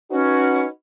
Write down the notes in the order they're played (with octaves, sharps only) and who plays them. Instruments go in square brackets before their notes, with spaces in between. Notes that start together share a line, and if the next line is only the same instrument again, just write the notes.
[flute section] C#4 [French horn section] D#4 F#4 B4